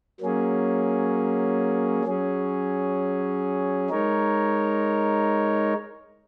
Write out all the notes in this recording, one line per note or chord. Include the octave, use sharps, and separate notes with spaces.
F#3 A#3 C#4 G#4
F#3 C#4 G#4
G#3 D#4 A#4 C#5